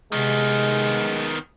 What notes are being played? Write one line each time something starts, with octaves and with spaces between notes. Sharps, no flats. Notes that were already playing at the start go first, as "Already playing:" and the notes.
C3 D#3 G#3 B3